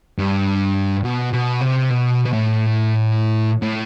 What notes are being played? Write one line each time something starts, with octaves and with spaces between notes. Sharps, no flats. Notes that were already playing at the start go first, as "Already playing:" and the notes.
G2
B2
B2
C3
B2
B2
A2
A2